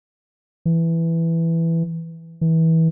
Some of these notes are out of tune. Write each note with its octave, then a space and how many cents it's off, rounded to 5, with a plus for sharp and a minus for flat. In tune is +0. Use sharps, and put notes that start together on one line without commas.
E3 +5
E3 -25